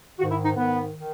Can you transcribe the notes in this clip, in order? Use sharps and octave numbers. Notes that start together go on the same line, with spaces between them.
G#2 D#3 F#4
E4
D#4
G#2 D#3 B3
D#3